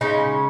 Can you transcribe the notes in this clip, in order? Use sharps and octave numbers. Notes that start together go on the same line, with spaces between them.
C#3 G#3 C#4 D#4